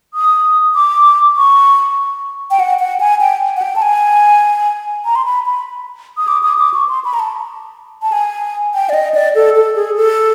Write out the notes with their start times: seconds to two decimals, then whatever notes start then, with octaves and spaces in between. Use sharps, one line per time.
0.14 D#6
0.75 D6
1.37 C#6
2.51 G5
2.60 F#5
2.80 F#5
3.00 G#5
3.20 G5
3.56 F#5
3.62 G5
3.76 A5
3.82 G#5
5.05 A#5
5.15 C6
5.25 B5
5.46 B5
6.17 D#6
6.28 D6
6.43 D#6
6.58 D6
6.74 C#6
6.89 C6
7.05 B5
7.14 A#5
7.19 A5
8.02 A5
8.12 G#5
8.74 G5
8.89 D5
8.94 D#5
9.14 D5
9.35 A4
9.56 A4
9.76 G#4
9.96 A4